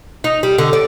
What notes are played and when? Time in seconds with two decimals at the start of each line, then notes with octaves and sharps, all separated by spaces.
0.24 D#4
0.43 G3
0.58 D3
0.73 D5